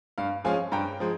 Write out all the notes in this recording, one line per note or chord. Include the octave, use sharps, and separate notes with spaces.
G2 F5
F3 G#3 C#4 F5 G#5
G2 G5 A#5
F3 G#3